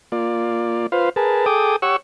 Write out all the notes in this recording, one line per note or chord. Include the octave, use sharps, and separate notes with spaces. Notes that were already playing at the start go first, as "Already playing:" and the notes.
A#3 F4 D5
F4 B4 C5 F5
G#4 A#4 B4 A5
G#4 A4 G5 D6 D#6
G4 C#5 F#5 C#6 E6